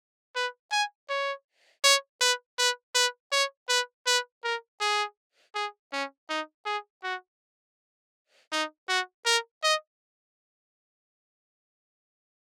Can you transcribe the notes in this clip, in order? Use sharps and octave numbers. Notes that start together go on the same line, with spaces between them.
B4
G#5
C#5
C#5
B4
B4
B4
C#5
B4
B4
A#4
G#4
G#4
C#4
D#4
G#4
F#4
D#4
F#4
A#4
D#5